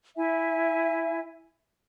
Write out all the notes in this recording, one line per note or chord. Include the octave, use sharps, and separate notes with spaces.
E4 E5 G#5